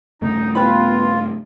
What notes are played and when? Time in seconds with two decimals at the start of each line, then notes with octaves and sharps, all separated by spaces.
0.22 G2 C#3 A3 D#4
0.55 B3 F4 G4 B4 B5